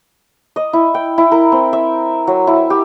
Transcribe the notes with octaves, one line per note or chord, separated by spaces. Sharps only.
D#5
E4
G5
E4
A#4
C4
E5
F#3
E4
G4